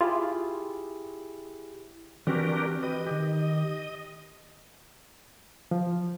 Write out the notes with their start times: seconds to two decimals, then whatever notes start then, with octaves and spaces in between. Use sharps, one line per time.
0.01 E4 F4 G4 G#4
2.27 E3 C4 D4 F#4 G4 A#4
2.83 G4 B4 D#5
3.07 D#3 G4
5.71 F3